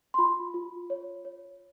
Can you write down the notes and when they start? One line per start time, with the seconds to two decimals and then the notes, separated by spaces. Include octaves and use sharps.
0.14 C6
0.18 F4 B5
0.54 F4
0.90 C#5
1.25 C#5